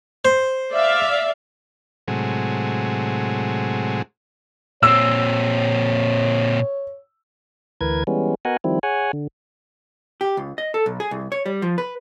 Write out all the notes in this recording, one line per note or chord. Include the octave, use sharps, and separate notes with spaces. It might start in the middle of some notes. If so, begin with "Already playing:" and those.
C5
D5 E5 F5
A2 C3 F#3 G#3
A#2 C4 C#5 E6
D2 E3 A#4 B4 G#6
E3 G3 G#3 B3 C#4
B3 F#4 A#4 D#5 F#5 G#5
D#3 F3 G3 C4 E4
G#4 C#5 F#5 G#5
D3
G4
C#2
D#5
A4
B1
G#4
C2
C#5
G3
F3
B4